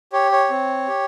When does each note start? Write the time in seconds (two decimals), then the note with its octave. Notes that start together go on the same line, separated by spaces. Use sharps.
0.13 G4 C#5
0.32 C#5
0.50 C4
0.87 G4